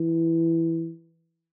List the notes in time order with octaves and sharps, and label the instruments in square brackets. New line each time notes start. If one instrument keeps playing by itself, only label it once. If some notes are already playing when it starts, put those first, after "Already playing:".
Already playing: [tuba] E3